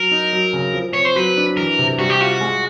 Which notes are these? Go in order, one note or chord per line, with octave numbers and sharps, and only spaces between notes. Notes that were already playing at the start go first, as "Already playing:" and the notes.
Already playing: F#3 A#4
D#4
F#3
C#3
F3
C4 C#5
C5
F#3 B4
D4
E3 A#4
C3
G3 F#4
G4
F4 F#4
G#3